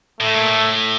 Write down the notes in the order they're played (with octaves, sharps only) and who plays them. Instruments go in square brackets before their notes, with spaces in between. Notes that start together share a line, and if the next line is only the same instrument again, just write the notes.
[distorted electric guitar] A2 [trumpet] A3
[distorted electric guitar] A#2
A2